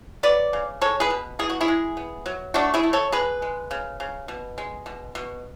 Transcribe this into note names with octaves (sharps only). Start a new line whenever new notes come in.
F#3 B4 D5
C#3
G#3 A4 C#5
G#4 B4
B2
E3 G#4
F#4
E4 G#4
G#3
B3
F#3
A3 D4 F#4
E4 G#4
A3
A4 C#5
G#3 G#4 B4
G#3
C#3
C#3
B2
G#3
B2
B2